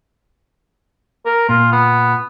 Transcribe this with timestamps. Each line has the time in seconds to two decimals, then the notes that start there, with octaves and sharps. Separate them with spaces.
1.25 A#4
1.49 A#2 F4
1.72 B3